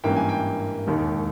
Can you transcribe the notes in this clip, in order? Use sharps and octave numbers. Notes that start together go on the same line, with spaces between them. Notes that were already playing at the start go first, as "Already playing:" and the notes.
G#1 G2 E3 A#3 C#4 G5
G#5
G5
E1 D#2 D#3 G#3